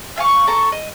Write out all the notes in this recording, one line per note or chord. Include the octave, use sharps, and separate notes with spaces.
E5 F5 G#5 C#6
A4 A5 A#5 C#6
D#5